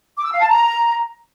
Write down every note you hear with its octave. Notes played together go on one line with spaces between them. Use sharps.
D6
E6
F5
A5
A#5